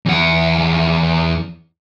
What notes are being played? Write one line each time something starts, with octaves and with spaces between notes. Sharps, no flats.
E2 F#5